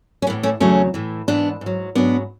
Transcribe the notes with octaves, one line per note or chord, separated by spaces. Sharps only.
C#4
A2 E3 B3
A3 C#4
E2 C#3 F#3 A3 C#4
A2 E3
G#2 E3 B3 D4
G#2
F#3
G#2 F#3 B3 D4